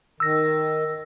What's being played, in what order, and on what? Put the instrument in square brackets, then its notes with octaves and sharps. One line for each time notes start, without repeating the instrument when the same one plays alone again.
[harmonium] D#3 [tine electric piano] E6 A#6